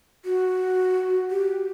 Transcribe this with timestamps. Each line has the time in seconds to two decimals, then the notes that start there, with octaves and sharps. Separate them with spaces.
0.25 F#4
1.31 G4